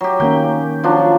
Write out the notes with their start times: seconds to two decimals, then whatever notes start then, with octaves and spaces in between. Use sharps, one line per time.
0.01 F#3 G4
0.20 D#3 A#3 C#4 G5
0.83 F3 F#3 D4